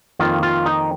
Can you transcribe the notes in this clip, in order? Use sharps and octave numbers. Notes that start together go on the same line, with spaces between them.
F2 D#3 A#3 F4
F4
D#4